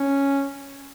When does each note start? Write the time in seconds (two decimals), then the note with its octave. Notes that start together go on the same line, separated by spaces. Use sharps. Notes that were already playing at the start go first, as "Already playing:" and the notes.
Already playing: C#4